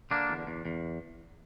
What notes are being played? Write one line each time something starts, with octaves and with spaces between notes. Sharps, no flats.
D3 A#3 D4
E2
E2
E2